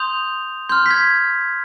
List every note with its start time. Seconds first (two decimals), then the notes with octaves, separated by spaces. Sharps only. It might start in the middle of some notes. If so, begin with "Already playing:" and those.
Already playing: C6 D#6 G6 F7
0.69 C6 F6 G6
0.86 B6
0.91 G#6